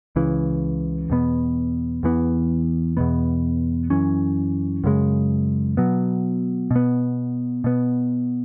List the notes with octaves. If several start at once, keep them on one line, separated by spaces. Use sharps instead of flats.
C#2 C#3 E3
E2 B2 B3
E2 E3 B3
E2 B2 B3
F#2 E3 C#4
F#2 C#3 G#3
B2 F#3 B3
B2 B3
B2 B3